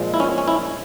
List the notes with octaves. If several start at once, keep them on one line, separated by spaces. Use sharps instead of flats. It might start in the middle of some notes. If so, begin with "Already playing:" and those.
Already playing: A#2 F3 G#3
E4
C#4
C#4
E4